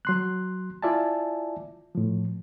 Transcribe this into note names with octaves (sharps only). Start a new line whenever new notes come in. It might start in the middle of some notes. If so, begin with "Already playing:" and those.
F#3 C6 F#6
E4 F4 D5 E5 G#5 A5
A2 F3